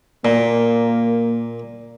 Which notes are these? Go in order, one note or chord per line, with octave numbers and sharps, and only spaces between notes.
A#2 A#3